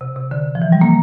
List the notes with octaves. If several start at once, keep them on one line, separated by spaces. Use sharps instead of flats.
C3
C3
D3
F3
E3
G3
A#3